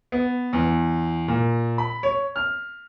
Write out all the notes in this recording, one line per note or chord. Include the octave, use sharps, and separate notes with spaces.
B3
E2
A#2
B5
C#5
F6